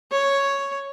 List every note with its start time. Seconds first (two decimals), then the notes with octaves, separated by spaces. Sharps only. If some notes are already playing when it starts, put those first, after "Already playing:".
0.12 C#5